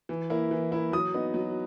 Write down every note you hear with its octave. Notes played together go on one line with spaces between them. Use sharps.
E3
A#3 E4
E3
A#3 E4
F#3 D#6
B3 D#4
F#3